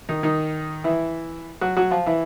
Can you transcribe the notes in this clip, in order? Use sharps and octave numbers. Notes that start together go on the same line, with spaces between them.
D#3 D#4
D#3 D#4
E3 E4
F#3 F#4
F#3 F#4
F3 F4
E3 E4